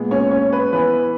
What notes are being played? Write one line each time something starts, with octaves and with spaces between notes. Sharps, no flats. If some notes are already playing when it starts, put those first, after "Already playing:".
Already playing: A#2 G#3 B3
C#4 C#5
C#4 C#5
B4
E3 B3 B4